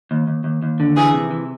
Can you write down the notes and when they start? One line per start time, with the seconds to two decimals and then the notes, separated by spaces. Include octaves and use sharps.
0.11 D#2
0.27 D#2
0.44 D#2
0.63 D#2
0.80 D3
0.96 E3 G#4
1.13 C3
1.31 E3